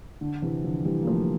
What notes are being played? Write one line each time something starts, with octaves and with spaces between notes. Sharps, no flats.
D3
C3 E3
D3 F3
E3 G3
A#3
F3 A3